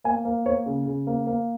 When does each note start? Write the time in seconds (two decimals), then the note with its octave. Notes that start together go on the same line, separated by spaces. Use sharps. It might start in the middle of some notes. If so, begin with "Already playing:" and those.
0.04 A#3 G#5
0.25 A#3
0.46 A#3 C#5
0.66 C#3
0.86 C#3
1.07 A#3
1.27 A#3